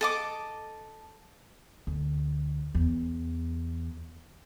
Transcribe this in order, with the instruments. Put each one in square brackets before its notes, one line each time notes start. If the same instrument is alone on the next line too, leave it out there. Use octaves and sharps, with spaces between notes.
[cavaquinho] A4 D#5 D6
[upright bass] D2
E2